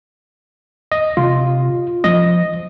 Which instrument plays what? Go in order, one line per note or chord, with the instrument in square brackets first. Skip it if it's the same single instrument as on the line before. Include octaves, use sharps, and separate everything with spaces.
[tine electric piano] D#5
[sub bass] C3 [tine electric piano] F4
[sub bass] F3 [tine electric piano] D#5